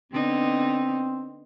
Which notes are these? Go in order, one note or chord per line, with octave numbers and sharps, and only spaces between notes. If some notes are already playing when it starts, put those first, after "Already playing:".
D3 B3 C4 D#4